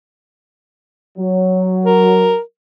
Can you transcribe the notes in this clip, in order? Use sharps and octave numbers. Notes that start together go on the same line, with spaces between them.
F#3
A#4